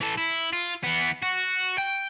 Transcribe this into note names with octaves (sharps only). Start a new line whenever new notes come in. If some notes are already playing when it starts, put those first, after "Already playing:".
E3 A4
E4
F4
E3 B3
F#4
G5